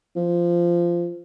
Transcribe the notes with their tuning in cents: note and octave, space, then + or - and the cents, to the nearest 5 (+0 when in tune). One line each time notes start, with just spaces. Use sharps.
F3 -15